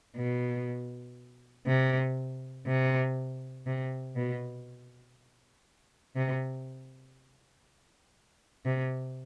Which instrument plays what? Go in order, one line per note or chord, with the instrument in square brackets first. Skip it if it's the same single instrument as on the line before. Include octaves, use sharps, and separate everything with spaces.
[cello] B2
C3
C3
C3
B2
C3
C3